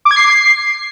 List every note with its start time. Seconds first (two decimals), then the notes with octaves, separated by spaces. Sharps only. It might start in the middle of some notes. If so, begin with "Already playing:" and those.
0.05 D6
0.11 G#6
0.16 C7